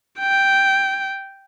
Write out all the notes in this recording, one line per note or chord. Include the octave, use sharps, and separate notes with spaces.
G5